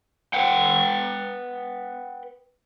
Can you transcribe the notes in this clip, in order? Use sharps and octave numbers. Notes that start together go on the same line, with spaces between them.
B4 F#5 G5